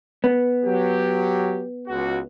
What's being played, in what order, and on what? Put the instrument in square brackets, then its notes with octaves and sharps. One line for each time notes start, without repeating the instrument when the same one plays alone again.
[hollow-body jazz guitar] B3
[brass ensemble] F#3 G4
C#2 F#4